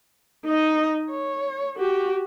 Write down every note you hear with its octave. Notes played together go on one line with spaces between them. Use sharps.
D#4 D#5
C#5
F#4 G4